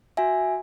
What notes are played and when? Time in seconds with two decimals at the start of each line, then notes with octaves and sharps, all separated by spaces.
0.17 F#4 E5 G#5